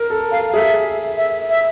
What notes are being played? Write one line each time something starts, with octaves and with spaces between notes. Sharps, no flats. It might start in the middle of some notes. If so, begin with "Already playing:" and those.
Already playing: A#4
A4
A#4 F5
G#4 E5
E5
E5